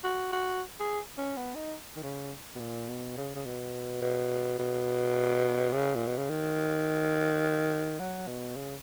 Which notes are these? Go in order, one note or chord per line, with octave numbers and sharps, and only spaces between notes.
F#4
F#4
G#4
C#4
B3
D#4
D#3
C#3
B2
A#2
B2
C#3
C#3
B2
B2
B2
C#3
A#2
B2
C#3
D#3
F#3
B2
C#3